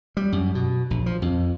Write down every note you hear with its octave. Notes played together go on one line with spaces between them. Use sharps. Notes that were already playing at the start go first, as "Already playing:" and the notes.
G3
F#2
B2
A#1
F3
F2